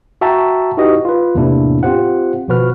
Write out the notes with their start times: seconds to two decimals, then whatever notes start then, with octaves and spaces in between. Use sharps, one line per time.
0.21 F#4 E5 G5 A5 A#5
0.77 D#4 E4 F#4 G4 B4 D#5
1.05 F4 B4
1.35 E2 A2 C3 A#3 D4 E4
1.83 C4 F4 G4 C5 F#5
2.48 G#1 B2 F3 F#4 B4 F6